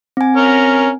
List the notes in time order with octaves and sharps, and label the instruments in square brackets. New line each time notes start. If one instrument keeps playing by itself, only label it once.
[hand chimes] C4 G#5
[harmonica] C#4 A#4 F6